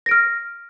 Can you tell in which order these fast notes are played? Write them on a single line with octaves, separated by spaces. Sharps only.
A#6 D7 F6